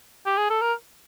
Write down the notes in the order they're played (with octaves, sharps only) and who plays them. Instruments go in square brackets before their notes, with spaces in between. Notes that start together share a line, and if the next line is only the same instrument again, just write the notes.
[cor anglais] G4
G#4
A4
A#4